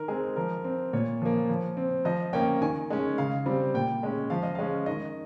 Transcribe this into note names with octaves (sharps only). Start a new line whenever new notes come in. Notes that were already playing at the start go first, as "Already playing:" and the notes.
Already playing: D#3 A#4
G#3 C4 G#4
F3 A#4
C4
A#2 C#5
F3 A#3
F3
C4
F3 D#5
A#3 C#4 G5
D#3 G#5
G#3 C#4
C#3 F5
G3 C4
A#2 G5
G#3 C#4
F3 F5
D#5
G#3 C#4 F5
D#3 D#5